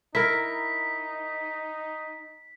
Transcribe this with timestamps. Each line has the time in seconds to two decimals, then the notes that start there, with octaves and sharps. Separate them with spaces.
0.15 D#4 E4 A#4 B6